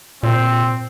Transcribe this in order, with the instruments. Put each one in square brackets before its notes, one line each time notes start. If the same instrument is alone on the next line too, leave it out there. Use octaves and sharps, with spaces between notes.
[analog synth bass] A#2 [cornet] C4